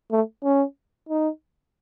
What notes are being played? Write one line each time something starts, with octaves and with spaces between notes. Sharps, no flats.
A3
C#4
D#4